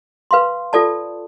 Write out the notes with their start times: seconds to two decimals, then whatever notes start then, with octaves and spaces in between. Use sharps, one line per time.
0.31 B4 F5 C6
0.73 F4 A4 D5 A5